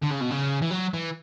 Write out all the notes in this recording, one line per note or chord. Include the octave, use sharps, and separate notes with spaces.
D3
C#3
B2
C#3
E3
F#3
E3